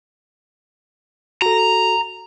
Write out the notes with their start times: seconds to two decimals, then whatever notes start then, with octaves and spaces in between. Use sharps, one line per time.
1.42 F#4 A4 A#5